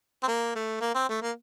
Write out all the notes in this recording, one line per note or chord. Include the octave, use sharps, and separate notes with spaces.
C4
A#3
A3
A#3
C4
A3
A#3